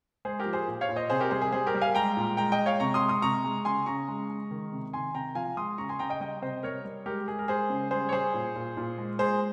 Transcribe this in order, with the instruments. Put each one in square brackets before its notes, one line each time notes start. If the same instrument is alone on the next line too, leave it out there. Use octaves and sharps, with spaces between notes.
[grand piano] G#3 G#4 C5
G4 A#4
F3
G#4 C5
A#2
C#5 F5
A#2
C5 D#5
C3 G#4 C5
G4 A#4
G3 G#4 C5
G#4
G3 G#4 C5
G4 A#4
G3
F5 G#5
G#3 G5 A#5
A#2
G#3 G5 A#5
D#5 G5
G#3
C#5 F5
C3 A#5 C#6
C6 D#6
G#3
C6 D#6
C3 A#5 C#6
G#3
C#3 G#5 C6
C#3 A#5 C#6
G#3
G#3
D#3
C3
D#3 G#5 C6
C3 G5 A#5
F3 F5 G#5
G#3 C6 D#6
C#3 A#5 C#6
G#5 C6
C#3 G5 A#5
D#5 G5
G3 D#5 G5
C3 C5 D#5
G3 A#4 C#5
G3
G#3 G4 A#4
G#3 G#4
A#4
G#3 G#4 C5
C#3
G3 G#4 C5
C#5
G3 G#4 C5
A#2
A#2
A#2
G#3
G#3 G#4 C5